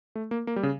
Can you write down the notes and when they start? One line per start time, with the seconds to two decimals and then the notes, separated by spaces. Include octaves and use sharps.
0.15 A3
0.31 A#3
0.47 A#3
0.56 G3
0.63 C#3